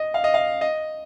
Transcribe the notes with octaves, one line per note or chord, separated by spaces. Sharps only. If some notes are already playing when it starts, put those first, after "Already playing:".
Already playing: D#5
F5
D#5
F5
D#5